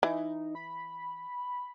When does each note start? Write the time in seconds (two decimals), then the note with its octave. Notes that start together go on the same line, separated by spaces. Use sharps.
0.03 E3 D#4
0.55 B5